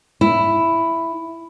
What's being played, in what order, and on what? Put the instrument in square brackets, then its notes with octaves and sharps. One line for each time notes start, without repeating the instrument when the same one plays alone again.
[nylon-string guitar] E4